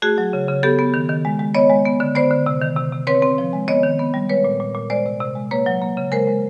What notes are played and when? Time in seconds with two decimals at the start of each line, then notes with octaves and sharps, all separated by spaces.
0.02 A3 F#4 G#4
0.18 F#3
0.33 C#3
0.48 C#3
0.63 B3 G4 A4
0.79 B3
0.94 D#3
1.09 D#3
1.25 G#3
1.39 G#3
1.55 B3 C#5 D#5
1.70 G#3
1.85 B3
2.00 D3
2.15 B3 C5 D5
2.31 D3
2.46 C3
2.62 D#3
2.77 C3
2.92 C3
3.07 C4 B4 C#5
3.22 C4
3.38 F3
3.53 G#3
3.68 B3 C#5 D#5
3.83 D#3
3.99 B3
4.14 G3
4.29 G#3 B4 C#5
4.44 A#2
4.60 A#2
4.75 A#2
4.90 G#3 C5 D5
5.06 C3
5.20 C3
5.35 G#3
5.51 A#3 B4 C#5
5.66 F#3
5.82 A#3
5.97 C#3
6.12 G#3 A#4 C5
6.27 G#3